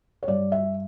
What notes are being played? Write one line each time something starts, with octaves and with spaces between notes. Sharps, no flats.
C#5
G2 D5
E5